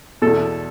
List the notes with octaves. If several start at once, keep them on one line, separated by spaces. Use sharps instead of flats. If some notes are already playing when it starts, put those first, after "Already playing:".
E2 B2 A4